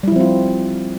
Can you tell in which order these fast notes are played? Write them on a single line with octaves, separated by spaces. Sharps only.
G3 E4 F3 C4 F4